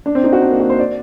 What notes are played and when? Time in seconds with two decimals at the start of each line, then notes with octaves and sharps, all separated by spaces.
0.06 D4
0.15 C4
0.24 D#4
0.33 F#4
0.42 D4
0.51 A#3
0.60 F#4
0.70 C5
0.79 D5